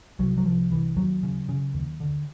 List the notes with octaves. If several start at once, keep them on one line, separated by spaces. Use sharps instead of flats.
C2 F#3
F#3
C2 F3
C2 E3
D#2 F#3
C#3
C#3
D#2
D3